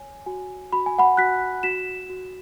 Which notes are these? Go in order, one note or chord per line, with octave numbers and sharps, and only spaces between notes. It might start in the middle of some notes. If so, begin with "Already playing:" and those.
Already playing: C#5 G#5
F#4 G#5
F#4 B5
G#5
F#5 B5
F#4 F#6 B6
F#4 B6 E7
F#4